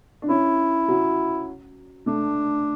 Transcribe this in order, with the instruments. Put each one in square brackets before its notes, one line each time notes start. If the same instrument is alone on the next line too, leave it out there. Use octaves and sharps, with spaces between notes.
[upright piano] D4
[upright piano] C#4 [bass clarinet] E4
[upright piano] F#3
[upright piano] A3 [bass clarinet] D4